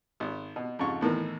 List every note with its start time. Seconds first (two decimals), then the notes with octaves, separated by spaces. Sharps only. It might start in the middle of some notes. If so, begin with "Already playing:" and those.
0.20 G#1
0.56 B2
0.79 F2 G#2 C#3 C#6
1.01 E2 A2 D#3 E3